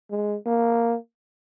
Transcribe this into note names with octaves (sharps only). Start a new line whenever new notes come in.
G#3
A#3